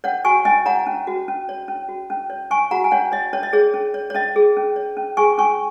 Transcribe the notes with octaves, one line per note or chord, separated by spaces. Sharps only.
C#4 C#5 F#5
F#4 G#5 C#6
C#4 D#5 G#5
C#5 F#5 A#5
C#4
F#4
C#4
C#5
C#4
F#4
C#4
C#5
C#4 G#5 C#6
F#4 F#5 A#5
G#5
C#4 C#5 F#5
C#5 D#5
C#4 C#5
D#5
G#4 C#5
C#4
C#5
C#5
C#4 D#5
G#4
C#4
C#5
C#4
G#4 G#5 C#6
C#4 G#5 C#6